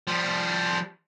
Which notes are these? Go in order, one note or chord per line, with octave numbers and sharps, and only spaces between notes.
F3 G3